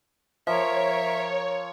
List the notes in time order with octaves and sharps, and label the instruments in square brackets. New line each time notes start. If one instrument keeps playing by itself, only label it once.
[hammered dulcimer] F3 [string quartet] A#4 [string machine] C#5 [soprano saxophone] E5